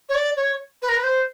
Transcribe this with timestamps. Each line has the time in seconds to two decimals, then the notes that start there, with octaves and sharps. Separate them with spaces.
0.09 C#5
0.14 D5
0.36 C#5
0.82 B4
0.88 A#4
0.96 B4
1.03 C5